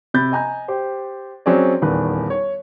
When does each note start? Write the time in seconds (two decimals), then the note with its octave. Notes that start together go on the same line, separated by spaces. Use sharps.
0.14 C3 B5 G6 A6
0.32 D#5 G#5 A#5 G6
0.68 G4 C5
1.46 F#3 C4 C#4 G#4 D5
1.82 D#1 E2 D#3 B4
2.30 C#5